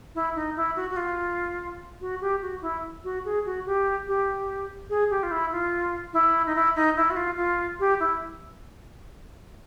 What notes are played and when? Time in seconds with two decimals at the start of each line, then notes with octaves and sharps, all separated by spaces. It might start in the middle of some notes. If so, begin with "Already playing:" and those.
0.15 E4
0.36 D#4
0.56 E4
0.76 F#4
0.90 F#4
0.97 F4
2.01 F#4
2.21 G4
2.42 F#4
2.62 E4
3.04 F#4
3.25 G#4
3.46 F#4
3.66 G4
4.07 G4
4.90 G#4
5.10 G4
5.23 F4
5.31 E4
5.52 F4
6.13 E4
6.46 D#4
6.55 E4
6.76 D#4
6.96 E4
7.10 F#4
7.17 F4
7.37 F4
7.80 G4
8.00 E4